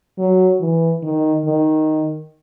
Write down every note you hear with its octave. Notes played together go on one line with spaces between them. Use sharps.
F#3
E3
D#3
D#3